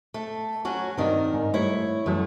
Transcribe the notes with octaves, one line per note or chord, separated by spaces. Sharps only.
A3
F#3 C#4 F#4
G2 D#3 C4 A#4 D5
G#2
G3 A3 E4 C#5
F#2 E3 F#3 A3